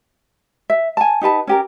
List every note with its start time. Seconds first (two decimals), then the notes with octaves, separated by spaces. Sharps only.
0.70 E5
0.97 G#5 A5
1.21 D#4 G4 B4 A5
1.47 C#4 G4 A#4